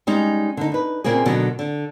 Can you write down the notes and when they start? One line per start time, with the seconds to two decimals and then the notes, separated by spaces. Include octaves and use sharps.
0.07 G3 G#3 C#4 D#4
0.57 D3 D#4
0.72 D#4 B4
1.04 A#2 C#3 A#3 C4 G#4
1.26 B2 D3 D#3 F#3
1.59 D3